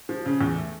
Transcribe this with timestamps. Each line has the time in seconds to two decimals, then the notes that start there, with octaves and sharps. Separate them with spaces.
0.09 F3
0.26 C#3
0.41 E2
0.56 A3